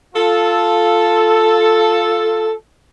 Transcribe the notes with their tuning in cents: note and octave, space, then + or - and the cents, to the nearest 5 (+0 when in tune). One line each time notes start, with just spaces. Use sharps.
F4 +0 A4 +0